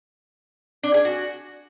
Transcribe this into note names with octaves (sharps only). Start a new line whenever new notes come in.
D4
G#4
F#4